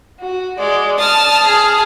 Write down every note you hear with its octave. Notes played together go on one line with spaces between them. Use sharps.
F#4
G#3 D5
A5 D#6 F6 A6
G#4 A5